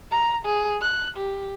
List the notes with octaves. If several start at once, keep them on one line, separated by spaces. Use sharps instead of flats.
A#5
G#4
F#6
G4